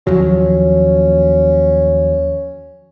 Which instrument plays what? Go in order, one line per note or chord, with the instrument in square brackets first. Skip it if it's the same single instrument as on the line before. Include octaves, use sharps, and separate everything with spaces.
[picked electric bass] D#2 F3 F#3 [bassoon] C#4